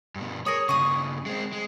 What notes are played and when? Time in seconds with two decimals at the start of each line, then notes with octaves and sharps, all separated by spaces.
0.15 G2 B2
0.46 G#4 A#4 C#5
0.69 G2 C#3 C#6 D#6
1.26 G#3 C4
1.53 G#3